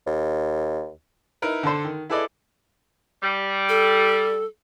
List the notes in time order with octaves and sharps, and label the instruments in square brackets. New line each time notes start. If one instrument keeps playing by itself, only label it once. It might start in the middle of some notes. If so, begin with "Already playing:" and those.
[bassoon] D#2
[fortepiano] D#4 E4 A#4 B4
D3 A4 C5
D#3
E4 G#4 A4 B4 D5 D#5
[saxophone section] G3
[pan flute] A4